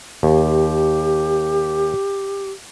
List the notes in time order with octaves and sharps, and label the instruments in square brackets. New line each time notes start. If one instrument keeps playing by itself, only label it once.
[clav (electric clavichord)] D#2 [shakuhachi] G4